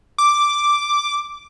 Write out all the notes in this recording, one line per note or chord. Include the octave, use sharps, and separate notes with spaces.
D6